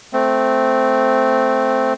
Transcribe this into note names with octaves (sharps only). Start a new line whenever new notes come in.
A3 C4